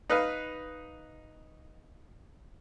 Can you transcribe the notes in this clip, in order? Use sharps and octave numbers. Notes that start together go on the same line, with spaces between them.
D#4 B4 F5